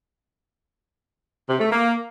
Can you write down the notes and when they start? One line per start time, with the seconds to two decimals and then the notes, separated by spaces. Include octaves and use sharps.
1.48 C3
1.60 A3
1.71 A#3